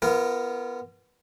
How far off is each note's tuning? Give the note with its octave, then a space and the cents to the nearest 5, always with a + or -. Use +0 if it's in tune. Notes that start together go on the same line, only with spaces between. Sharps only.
B3 +0 F4 -35 A#4 +0